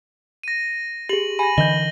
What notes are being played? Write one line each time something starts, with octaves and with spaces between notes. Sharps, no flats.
A#6 D#7
G4 G#4 F#7
G#5 B5 A#6 D#7
D3 E3 D#5 G6 A#6 G7